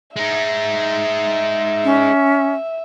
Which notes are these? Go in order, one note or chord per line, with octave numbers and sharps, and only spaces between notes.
G#3 D#4 E5
C#4